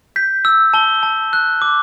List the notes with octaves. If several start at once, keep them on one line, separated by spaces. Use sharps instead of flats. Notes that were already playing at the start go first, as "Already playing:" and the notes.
G6 B6
E6
A5 G7
A5
F#6
D6